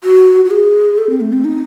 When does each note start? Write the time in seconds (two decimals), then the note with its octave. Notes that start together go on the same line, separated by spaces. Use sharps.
0.04 F#4
0.45 F#4
0.51 G#4
0.98 A4
1.10 C4
1.21 A3
1.33 C4
1.45 D#4